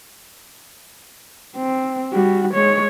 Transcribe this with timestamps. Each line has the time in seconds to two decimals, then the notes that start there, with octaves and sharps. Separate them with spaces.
1.57 C4
2.13 G3 F#4
2.54 G#3 C#5